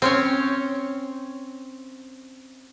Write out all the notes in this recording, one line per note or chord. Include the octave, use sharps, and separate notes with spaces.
C4 C#4 C#5